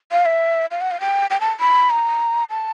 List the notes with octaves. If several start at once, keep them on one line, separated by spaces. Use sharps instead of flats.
F5
E5
F5
F#5
F5
G5
G5
A5
B5
A#5
A5